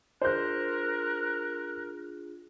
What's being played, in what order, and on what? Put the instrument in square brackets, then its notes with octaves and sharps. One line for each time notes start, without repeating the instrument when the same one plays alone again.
[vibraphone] D4 F4 G#4 [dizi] A#4 [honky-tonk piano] C5 G6 [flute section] F#6